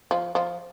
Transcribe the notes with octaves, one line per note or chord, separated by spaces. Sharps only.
F3
F3